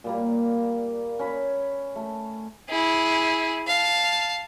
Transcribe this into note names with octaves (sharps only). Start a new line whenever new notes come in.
A#2 G3 A#3
C#4 B5
A3
E4 G#4
F5 A5